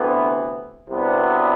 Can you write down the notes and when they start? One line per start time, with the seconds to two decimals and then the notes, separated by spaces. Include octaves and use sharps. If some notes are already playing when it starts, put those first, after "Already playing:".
Already playing: D2 C3 E3 B3
0.89 C2 C3 F#3 B3 D4